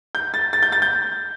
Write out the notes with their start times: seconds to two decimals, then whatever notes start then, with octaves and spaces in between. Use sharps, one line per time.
0.15 G6
0.34 A6
0.53 A6
0.63 G6
0.72 A6
0.82 G6